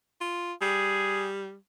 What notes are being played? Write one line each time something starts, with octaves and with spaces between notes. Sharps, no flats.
F4
G3 G#4